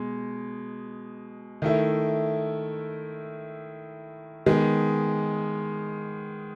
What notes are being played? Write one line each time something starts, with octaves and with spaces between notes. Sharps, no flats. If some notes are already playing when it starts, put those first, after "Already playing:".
Already playing: B2 G#3
D#3 A3 E4
D#3 G#3 B3